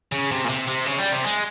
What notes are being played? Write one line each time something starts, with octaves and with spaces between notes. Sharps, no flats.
C#3
C3
A#2
C3
C3
C#3
G3
C3
G#3